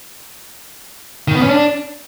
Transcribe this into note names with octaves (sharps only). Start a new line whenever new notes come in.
D#3
B3
C#4
D4